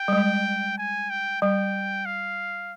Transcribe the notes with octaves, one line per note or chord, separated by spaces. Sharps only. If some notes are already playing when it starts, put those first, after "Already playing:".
Already playing: G5
G3
G#3
G#5
G5
G3 G5
F5